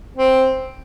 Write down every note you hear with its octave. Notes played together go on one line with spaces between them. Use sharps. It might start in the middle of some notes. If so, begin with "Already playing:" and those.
C4